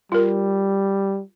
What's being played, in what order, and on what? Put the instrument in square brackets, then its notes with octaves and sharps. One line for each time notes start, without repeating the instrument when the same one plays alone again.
[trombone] G3 [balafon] F4 A#4